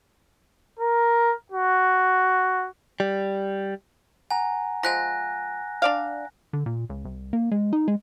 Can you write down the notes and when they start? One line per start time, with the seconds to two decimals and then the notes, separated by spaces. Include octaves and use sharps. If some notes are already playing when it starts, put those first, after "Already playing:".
0.79 A#4
1.52 F#4
3.00 G3
4.30 F#5 G#5 A#5
4.83 F3 G#3 G#5 F#6 A#6
5.82 D4 D5 F5
6.53 D3
6.66 A#2
6.90 C#2
7.05 C2
7.33 A#3
7.51 G#3
7.73 D#4
7.88 G#3